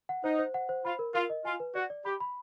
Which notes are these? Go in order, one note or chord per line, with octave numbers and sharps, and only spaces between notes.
F#5
D#4 C5
C5
F#5
C5
F4 B5
A#4
F4 A#4
D#5
F4 G#5
B4
F#4 D5
D5
G4 B5
B5